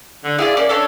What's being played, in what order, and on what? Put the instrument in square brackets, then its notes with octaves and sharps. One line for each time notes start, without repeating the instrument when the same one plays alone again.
[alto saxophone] D3
[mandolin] E4 F4 D5 [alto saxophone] G#4
[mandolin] A#3 C#4 [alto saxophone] D5
[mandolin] C#4 D4 C#5 [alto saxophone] A4